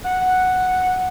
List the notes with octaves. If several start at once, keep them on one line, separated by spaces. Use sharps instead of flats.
F#5